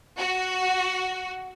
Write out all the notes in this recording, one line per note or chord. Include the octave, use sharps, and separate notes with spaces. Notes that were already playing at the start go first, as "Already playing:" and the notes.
F#4